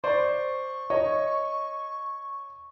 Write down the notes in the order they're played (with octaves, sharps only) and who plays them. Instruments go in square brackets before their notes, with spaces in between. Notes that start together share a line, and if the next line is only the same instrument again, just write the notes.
[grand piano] C5 D5 [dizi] C#6
[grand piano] C#5 D#5